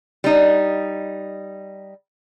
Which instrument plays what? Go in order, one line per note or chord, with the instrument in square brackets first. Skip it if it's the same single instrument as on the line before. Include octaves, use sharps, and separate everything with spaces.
[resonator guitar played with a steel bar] G3 D#4